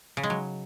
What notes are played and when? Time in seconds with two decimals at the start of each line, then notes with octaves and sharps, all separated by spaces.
0.17 C#3
0.23 G#3
0.30 F#3